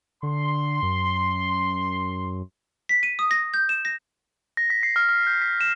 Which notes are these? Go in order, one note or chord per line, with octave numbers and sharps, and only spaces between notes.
D3 C6
F#2
B6
D#7
D#6
A#6
G6
E7
A#6
A#6
B6
C7
F6
F6
G6
B6
E7